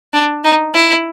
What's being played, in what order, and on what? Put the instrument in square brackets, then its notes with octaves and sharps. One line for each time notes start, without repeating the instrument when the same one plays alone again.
[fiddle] D4
D#4
E4